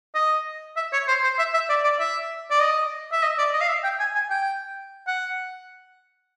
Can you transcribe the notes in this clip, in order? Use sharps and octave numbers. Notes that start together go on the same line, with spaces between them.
D#5
E5
C#5
C5
C5
E5
E5
D5
D5
E5
D5
D#5
E5
D#5
D5
D#5
F5
E5
G5
G#5
G#5
G5
F#5